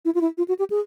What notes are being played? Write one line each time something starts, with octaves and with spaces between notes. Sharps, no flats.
E4
F4
E4
F4
F#4
G4
G#4